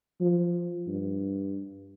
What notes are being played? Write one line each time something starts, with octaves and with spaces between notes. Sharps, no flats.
F3
G2